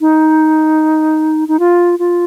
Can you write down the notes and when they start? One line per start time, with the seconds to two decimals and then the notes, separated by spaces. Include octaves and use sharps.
0.01 D#4
1.48 D#4
1.59 F4
1.99 F4